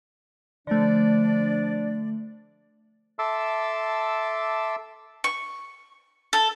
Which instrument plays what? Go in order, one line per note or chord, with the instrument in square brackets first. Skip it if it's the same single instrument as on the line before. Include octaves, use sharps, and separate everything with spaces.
[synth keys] D3 A3 [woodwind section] F3 D4 D5
[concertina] A4 E5 A5 C6 D6 E6
[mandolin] C#6
A4